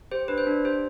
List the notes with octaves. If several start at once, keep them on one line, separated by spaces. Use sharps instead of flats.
G4 C5
D4 B4
C5
D4
G4 C5